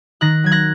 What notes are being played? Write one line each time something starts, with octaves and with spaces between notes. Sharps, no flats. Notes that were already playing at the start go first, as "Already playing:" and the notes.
D#3 F#6 A#6
F#3 G#6
F#6 A#6